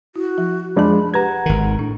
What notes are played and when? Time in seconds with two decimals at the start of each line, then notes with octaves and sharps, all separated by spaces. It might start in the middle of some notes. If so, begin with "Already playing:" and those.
0.16 E4 F#4
0.38 F3
0.76 F2 F3 G#3 D4 G#4 B5
1.14 G4 B4 F#5 A#5 G#6
1.46 G#1 D#3
1.79 A2 D4